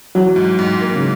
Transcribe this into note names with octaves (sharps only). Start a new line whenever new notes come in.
E3 F#3
G#2
G#2
A#3
C#3